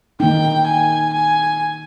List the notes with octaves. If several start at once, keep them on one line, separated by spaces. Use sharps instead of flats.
D#3 A#3 D#4 G5
G#5
G#5